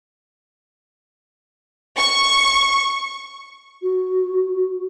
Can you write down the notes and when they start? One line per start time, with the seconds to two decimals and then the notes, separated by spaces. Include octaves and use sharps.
1.98 C#6
3.82 F#4